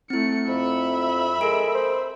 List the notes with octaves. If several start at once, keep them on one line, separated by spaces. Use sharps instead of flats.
A3 C4 E4 C#7
F2 E5 B5
G#3 A4 A#4 D7
C5